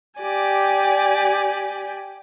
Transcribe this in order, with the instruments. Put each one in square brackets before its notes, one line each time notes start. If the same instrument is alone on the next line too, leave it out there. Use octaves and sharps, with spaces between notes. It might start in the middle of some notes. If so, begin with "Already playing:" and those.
[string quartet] G4 D5 G#5